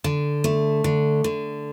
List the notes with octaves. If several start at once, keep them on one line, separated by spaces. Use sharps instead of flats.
D3
A3
D3
D3